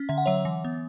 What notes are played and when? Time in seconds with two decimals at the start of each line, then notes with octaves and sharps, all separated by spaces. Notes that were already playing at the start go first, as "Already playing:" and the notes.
Already playing: C#4
0.09 D3 E5
0.18 F#5
0.26 F#3 C#5 E5
0.45 E3
0.64 B3